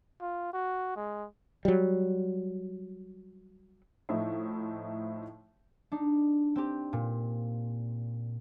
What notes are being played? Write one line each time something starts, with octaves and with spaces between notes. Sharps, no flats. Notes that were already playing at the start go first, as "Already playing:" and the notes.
F4
F#4
G#3
F#3 G3
A2 F3 D#4 E4
D4 D#4
C4 G4
A#2